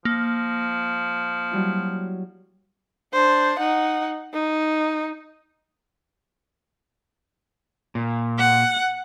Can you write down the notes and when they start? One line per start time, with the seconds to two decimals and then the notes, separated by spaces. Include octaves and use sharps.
0.05 F3 A#3
1.51 F#3 G3 E4
3.13 D4 C5
3.59 D#4 F#5
4.33 D#4
7.95 A#2
8.39 F#5